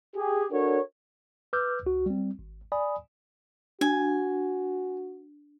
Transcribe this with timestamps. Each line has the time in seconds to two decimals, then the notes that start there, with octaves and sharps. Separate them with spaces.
0.16 G4 G#4
0.52 D4 F#4 A4 A#4 C#5
1.53 B4 D6 E6 F6 G6
1.83 C#2 F#4
2.06 G3 C4
2.39 G#1
2.72 D5 G#5 B5 D#6
3.81 D4 F#4 G#5